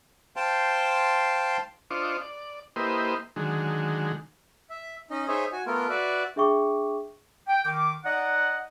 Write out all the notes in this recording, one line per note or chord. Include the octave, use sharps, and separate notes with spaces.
C5 F5 G5 A5 C6
D4 F4 C5 D#5 C#6 D6
D5
A#3 E4 G4 B4 C5 D#5
D3 D#3 F#3 G#3
E5
C#4 D#4 D#5
D#4 G#4 C5 C#5 E5
F#4 G#5
A3 B3 F4 A#4
F#4 B4 D5 E5
D4 G#4 E5 G5 C#6 D6
G5
D#3 D6
D#4 D5 D#5 F#5